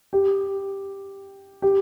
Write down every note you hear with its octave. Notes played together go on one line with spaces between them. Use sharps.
G4
G4